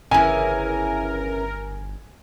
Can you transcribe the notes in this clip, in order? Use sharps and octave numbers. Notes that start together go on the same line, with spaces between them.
G1 C#3 E3 A#4 G#5